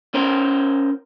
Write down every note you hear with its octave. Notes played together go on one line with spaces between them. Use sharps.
C#4 A#4 C5